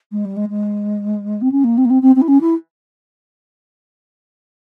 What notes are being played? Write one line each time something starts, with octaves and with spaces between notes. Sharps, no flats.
G#3
G3
G#3
G#3
C4
C#4
A#3
C4
A#3
C4
C4
C4
E4
C#4
E4